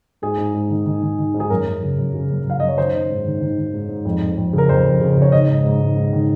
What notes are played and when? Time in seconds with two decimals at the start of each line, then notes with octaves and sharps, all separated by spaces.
0.22 G#2 G#4
0.38 G#2
0.54 G#2
0.70 D#3
0.86 D#3
1.02 D#3
1.19 D#3
1.34 G#2
1.40 G#4
1.50 F#2 A#4
1.66 F#2
1.83 C#3
1.99 F#2
2.14 C#3
2.30 F#2
2.46 F#2 F5
2.60 F#2 D#5
2.68 C#5
2.78 D#3 C5
2.93 D#3
3.10 G#2
3.26 D#3
3.41 D#3
3.58 D#3
3.74 G#2
3.89 G#2
4.05 F2
4.22 F2
4.37 F2
4.53 C#3
4.58 A#4
4.69 F2 C5
4.85 F2
5.01 C#3
5.17 C#3 C#5
5.32 D#3 D#5
5.48 G#2
5.65 G#2
5.80 G#2
5.97 G#2
6.13 D#3